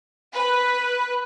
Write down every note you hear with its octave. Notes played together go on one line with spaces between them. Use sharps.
B4